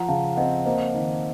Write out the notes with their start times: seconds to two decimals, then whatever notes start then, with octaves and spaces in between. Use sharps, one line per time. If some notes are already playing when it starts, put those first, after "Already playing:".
Already playing: F3 F#5 A#5
0.08 C#3 F5 A5
0.36 C4 D#5 F#5
0.65 A#3 C5 D#5
0.94 D#3